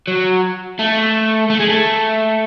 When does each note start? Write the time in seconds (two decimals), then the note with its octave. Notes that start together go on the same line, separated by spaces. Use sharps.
0.08 F#3
0.79 A3
1.50 A3
1.60 G#3
1.70 A3